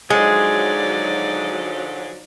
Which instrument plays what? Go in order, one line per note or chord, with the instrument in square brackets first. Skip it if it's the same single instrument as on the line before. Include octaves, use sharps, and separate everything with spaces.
[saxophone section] D3 F3 F#3 [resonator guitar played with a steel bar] G#3 [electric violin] D#4 D5 [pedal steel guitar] G#4